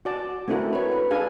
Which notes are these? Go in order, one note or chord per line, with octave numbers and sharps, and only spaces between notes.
F#4 D5 A5
A3 C4 D4 E4 F#4 A#4
B4 C#5
B4
D4 G#4 A4 F5 G#5